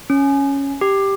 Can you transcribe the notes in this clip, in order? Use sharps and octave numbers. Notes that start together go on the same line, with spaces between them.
C#4
G4